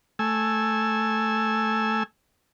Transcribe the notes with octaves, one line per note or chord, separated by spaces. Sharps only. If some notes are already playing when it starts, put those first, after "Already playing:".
A3 G#5 E6